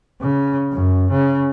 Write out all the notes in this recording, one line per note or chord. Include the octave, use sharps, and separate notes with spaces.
C#3
F#2
C#3